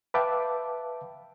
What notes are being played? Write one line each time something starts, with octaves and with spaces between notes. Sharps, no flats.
B4 E5 F5 G5 A5 D6